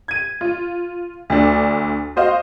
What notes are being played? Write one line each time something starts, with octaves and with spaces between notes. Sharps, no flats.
G#6 D#7
F4
D2 D4
F#4 C5 D#5 F5